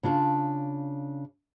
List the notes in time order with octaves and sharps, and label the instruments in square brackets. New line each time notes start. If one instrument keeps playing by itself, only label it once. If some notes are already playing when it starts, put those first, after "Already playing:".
[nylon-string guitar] C#3 D4 F4 A5